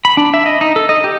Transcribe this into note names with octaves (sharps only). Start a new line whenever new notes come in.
B5
D4
E5
D#5
D#4
A4
D#5
G4